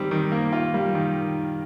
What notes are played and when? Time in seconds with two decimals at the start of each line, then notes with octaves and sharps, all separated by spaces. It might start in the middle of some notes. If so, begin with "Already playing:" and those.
Already playing: D#3 G3 C4
0.11 D#3
0.32 A#3
0.53 F4
0.74 G3
0.95 D#3